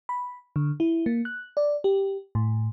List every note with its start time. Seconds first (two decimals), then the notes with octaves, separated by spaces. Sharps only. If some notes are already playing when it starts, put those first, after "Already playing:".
0.09 B5
0.56 D3
0.80 E4
1.06 A#3
1.25 F#6
1.57 D5
1.84 G4
2.35 A2